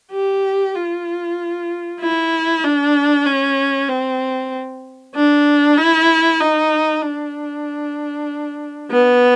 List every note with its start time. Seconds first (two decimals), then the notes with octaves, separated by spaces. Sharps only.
0.12 G4
0.75 F4
2.01 E4
2.64 D4
3.26 C#4
3.89 C4
5.14 D4
5.77 E4
6.40 D#4
7.02 D4
8.91 B3